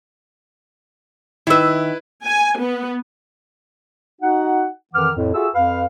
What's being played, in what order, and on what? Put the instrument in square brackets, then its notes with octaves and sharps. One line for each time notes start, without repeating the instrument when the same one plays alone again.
[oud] D#3 E5 [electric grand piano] E4 B4
[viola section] G#5
B3
[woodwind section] D#4 F#4 F#5
F2 D#3 E3 F#5 D6 F6
F2 A2
F4 F#4 G#4 A4 E5 E6
F2 B4 F5